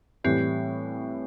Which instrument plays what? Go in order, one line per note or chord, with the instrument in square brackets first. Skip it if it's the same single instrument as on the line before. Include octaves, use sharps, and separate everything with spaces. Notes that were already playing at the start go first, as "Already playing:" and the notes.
[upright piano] A2 E3 G3 [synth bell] C4